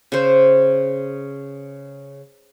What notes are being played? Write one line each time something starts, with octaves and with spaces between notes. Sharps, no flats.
C#3 C5